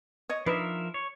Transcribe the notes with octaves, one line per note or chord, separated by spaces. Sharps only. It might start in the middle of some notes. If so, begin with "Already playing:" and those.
C#5 D#5
F3 D4 D#4 A#4 B4 E5
C#5